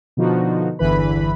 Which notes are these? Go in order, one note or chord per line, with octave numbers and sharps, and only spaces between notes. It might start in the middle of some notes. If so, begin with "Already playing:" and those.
B2 D3 F3 D#4 F#4
G1 E2 D3 E3 B4 B5